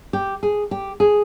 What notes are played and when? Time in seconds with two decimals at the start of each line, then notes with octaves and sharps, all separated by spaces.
0.13 G4
0.43 G#4
0.71 G4
1.00 G#4